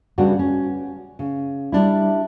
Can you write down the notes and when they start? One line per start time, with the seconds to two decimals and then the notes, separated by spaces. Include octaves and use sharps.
0.18 C#3 G3 B3 D4 F#4
0.39 C#4
1.19 C#3
1.72 G3 D4 E4